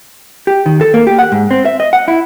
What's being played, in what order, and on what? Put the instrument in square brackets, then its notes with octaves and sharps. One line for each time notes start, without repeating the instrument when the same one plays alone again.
[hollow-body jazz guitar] G4
D#3
A4
A#3
G4
F#5
G#2
C4
E5
D#5
F#5
E4